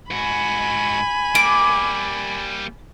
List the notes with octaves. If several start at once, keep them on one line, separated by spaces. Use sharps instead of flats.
G#2 F#4 G#5 B5
G3 A#3 D6